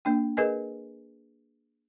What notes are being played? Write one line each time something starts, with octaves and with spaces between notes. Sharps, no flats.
A#3 D4 G5
G#4 A#4 B4 D#5 G#5